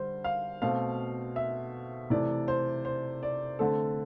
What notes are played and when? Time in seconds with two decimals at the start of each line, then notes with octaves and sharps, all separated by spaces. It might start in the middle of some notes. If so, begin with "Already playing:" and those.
Already playing: D3 G3 C5
0.24 F5
0.62 B2 A3 C4 F5
1.36 E5
2.10 C3 E3 A3 D5
2.48 C5
2.85 C5
3.23 D5
3.59 D3 A3 C4 A4